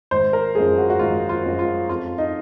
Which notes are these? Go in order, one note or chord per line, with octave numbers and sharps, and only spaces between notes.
G#1 C5
A#4
F#2 F3 G#3 G#4
F#4
F#4
G#1 F4
F4
F#2 F3 G#3
F4
F2 F4
D#4